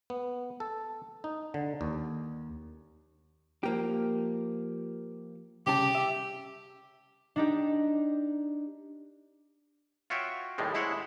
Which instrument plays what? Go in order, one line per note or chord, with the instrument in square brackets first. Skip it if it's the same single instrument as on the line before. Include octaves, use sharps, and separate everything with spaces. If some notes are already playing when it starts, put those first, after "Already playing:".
[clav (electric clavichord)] B3
A4
D#4
D3
D#2
[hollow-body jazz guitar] F3 A#3 G4
[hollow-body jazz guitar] C2 C#3 A5 [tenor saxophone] G4
[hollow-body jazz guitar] E5
[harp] D4 D#4 G4
[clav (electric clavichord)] F4 F#4 C#5 E5 G5
D#2 A2 G3 G#3
G#3 E4 C5 C#5 F#5